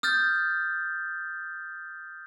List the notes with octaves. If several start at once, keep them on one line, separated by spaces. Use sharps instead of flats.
D#6 F6 G6 A6